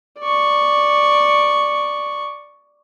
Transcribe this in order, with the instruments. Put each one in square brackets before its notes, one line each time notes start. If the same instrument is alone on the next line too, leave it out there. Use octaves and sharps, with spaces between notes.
[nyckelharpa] D5 C#6